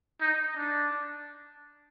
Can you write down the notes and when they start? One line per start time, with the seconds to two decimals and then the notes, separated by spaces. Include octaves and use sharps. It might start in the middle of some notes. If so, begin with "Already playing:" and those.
0.21 D#4
0.56 D4